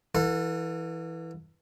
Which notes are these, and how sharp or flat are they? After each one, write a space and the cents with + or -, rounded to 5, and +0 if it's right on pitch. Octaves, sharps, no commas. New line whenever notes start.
E3 +0 A4 +30 F#5 -35